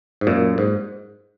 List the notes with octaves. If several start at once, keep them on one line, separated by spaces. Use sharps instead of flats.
G#2
F#2 A#2
G#2